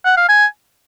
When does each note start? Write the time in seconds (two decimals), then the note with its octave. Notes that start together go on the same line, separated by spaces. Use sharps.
0.05 F#5
0.17 F5
0.29 G#5